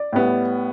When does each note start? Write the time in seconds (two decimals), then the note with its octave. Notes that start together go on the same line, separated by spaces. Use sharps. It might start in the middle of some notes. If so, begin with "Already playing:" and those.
Already playing: D5
0.13 A2 G3 B3